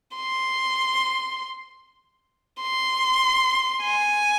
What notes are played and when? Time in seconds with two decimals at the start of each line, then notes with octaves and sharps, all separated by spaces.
0.17 C6
2.62 C6
3.84 G#5